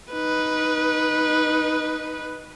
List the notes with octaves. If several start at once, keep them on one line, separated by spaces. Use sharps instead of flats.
D#4 B4